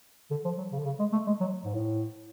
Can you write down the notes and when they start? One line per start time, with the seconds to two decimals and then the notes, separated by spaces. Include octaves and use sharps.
0.31 D3
0.44 F3
0.58 F#3
0.72 C#3
0.79 D3
0.85 C#3
0.99 G#3
1.12 A3
1.27 G#3
1.40 F#3
1.65 G#2
1.74 A2